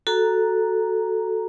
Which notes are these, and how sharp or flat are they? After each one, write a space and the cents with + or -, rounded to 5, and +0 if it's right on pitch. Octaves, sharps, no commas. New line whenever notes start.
F#4 +0 A4 +0 A#5 +0